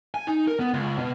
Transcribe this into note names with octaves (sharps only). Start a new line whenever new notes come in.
G#5
D#4
A#4
B3
C#2
B2